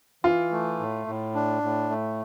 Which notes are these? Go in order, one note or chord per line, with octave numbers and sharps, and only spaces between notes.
E3 F4
A3
A2
A2
D4
A2
A3